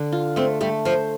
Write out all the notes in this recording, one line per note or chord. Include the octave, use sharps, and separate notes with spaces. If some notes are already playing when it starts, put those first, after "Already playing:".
Already playing: D3
F4
A3 C4
G3 A3
F3 C5